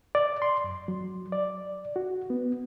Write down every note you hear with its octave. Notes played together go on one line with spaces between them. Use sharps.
D5
C6
F#2
F#3
D5
F#4
B3